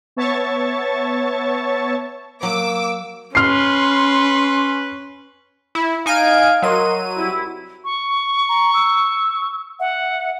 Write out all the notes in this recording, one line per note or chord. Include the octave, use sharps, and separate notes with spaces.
B3 C#5 E5 A5 C#6 A6
F#3 A#3 D6 E6
C#4 B4 C6 F6 C7
E4
D#4 F5 G#5 D7
F#3 A#4 D#5 C6 D#7
C2 E4
C#6
A#5
E6
E5 F#5